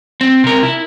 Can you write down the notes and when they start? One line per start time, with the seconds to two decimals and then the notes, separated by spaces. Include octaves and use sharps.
0.21 C4
0.44 C3 A#4
0.63 E4